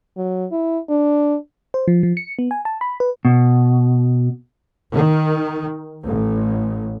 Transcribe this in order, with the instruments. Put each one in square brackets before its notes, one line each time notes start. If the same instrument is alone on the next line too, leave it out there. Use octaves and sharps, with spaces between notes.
[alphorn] F#3
E4
D4
[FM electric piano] C5
F3
F3
C#7
B3
G#5
A5
B5
B4
[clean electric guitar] B2
[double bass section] D#3
A1